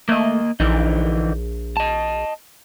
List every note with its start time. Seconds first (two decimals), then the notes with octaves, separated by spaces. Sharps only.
0.09 A3 A#3 D#5
0.60 A#1 D3 E3 D#4
1.77 D#5 A5